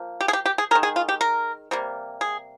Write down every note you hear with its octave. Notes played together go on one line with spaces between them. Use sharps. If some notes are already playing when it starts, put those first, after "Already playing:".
Already playing: F3 A#3
G4
G#4
G4
G4
G#4
D#3 G#3 A#4
G#4
F4
G4
A#4
C3 G3 A#3
G#4